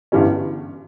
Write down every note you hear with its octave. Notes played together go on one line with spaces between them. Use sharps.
G1 G2 E3 G3 C#4